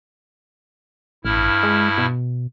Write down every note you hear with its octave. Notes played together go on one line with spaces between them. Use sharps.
A1 G2 E4 F6
G#3
B2